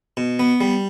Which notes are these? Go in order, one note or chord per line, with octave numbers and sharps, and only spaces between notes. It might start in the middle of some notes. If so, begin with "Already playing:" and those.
B2
B3
G3